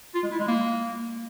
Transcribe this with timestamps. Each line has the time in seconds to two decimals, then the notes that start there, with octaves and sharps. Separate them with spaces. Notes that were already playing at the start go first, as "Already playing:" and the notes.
0.15 F4
0.23 G#3
0.31 E4
0.40 G#3
0.48 A#3